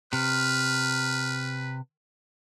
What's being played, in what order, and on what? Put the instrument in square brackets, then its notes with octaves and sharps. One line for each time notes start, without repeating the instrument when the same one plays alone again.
[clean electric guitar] C3 [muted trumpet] B4 [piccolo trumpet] F6